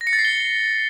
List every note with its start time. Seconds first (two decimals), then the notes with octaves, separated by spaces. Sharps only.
0.01 A#6
0.07 C#7
0.13 A6
0.19 C7
0.25 G7